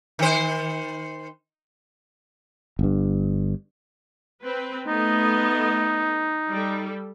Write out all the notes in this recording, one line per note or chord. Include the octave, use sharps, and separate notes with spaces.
D#3 C5
G1 G2
C4 B4
A3 B3 D#4 D#5
G3 A4